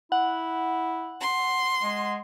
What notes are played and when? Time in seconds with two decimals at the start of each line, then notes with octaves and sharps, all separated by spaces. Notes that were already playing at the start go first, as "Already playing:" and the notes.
0.12 E4 F#5
1.21 C6
1.83 G#3